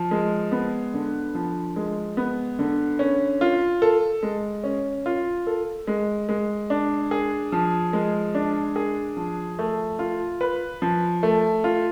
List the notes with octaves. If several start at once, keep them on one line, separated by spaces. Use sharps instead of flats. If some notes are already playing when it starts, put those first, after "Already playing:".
Already playing: F3
G#3
B3
D3
F3
G#3
B3
D3
C#4
F4
A4
G#3
C#4
F4
A4
G#3
G#3
D4
G#4
F3
G#3
D4
G#4
F3
A3
F4
B4
F3
A3
F4